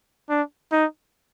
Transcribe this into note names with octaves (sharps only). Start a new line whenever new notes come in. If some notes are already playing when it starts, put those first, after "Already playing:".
D4
D#4